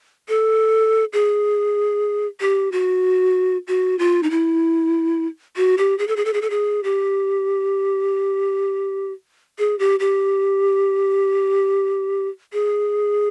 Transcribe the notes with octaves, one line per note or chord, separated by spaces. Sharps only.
A4
G#4
G4
F#4
F#4
F4
D#4
E4
F#4
G4
G#4
A4
G#4
A4
G#4
A4
G#4
G4
G#4
G4
G4
G#4